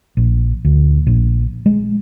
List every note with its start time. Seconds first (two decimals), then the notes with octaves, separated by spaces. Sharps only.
0.17 A#1
0.65 D2
1.07 A#1
1.66 G#3